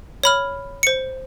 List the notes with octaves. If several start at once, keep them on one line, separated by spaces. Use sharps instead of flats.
C#5 B5 F6
C5 C#7